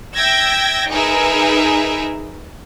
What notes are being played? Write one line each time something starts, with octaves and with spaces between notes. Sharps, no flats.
E5 G5 E6 G#6 A#6
D#4 G#4 A#4 B4 E5